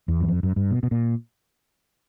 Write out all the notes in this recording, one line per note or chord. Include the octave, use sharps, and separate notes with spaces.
E2
F#2
F2
F#2
G2
B2
B2
A#2